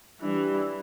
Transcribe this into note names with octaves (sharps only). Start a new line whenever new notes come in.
E3 G3 D4